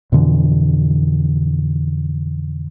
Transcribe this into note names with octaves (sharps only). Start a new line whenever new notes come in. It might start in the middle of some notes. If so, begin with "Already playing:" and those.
F2 B2 D3 E3